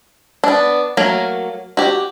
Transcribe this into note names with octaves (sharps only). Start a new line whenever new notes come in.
B3 D4
F#3 A3 A#3 A#4
F#4 G4